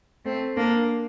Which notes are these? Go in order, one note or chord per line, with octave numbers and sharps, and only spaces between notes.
A3 C4
A#3 D4